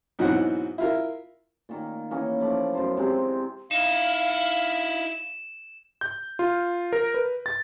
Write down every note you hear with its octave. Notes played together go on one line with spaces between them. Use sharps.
G#2 B2 E3 F#3 C4 F#5
E4 F4 A#4
A#2 D#3 A#3
E3 A#3 C#4 D#4
F3 A3 E4 D5
F#2 B2 C5 A#5
C3 G#3 C4
D#4 E4 F5 E7
G6
F4
A#4
B4
A6